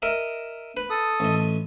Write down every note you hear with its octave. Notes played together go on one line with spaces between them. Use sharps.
A#4 D#5 E5
B4
A4 D#6
A1 D#5